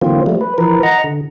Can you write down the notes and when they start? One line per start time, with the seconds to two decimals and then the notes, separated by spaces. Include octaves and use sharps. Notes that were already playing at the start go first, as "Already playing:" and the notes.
0.02 D3 E3 F#3 A#3 C4 F4
0.26 F3 G3 A3
0.41 B4
0.58 E3 F3 A#4 B4
0.83 D#5 F#5 A#5
1.04 D3